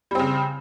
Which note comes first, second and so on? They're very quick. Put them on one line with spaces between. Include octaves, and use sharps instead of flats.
G3 C4 C#3